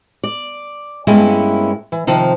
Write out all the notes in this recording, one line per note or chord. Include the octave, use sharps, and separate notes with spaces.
D5
G2 G#3 A#3 B3 C#4 E4
E3
C3 D#3 F3 A5